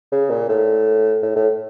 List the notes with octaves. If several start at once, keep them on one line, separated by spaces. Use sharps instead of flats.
C#3
A#2
A2
A2
A2